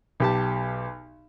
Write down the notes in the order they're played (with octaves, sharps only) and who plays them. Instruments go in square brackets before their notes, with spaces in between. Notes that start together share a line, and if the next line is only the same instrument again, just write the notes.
[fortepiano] B1 G4 A5